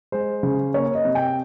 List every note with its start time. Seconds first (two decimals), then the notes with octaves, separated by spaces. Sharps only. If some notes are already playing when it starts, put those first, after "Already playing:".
0.12 G#3 C5
0.43 C#3
0.74 A#3 C#5
0.95 D#5
1.05 C3
1.15 G5